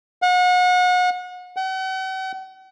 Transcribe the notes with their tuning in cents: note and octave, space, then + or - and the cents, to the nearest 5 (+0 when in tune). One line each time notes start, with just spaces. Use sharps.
F#5 -35
F#5 +45